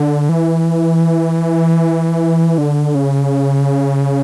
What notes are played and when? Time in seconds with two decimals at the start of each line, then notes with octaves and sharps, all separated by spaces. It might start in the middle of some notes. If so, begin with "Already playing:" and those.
Already playing: D3
0.29 E3
2.58 D3
2.95 C#3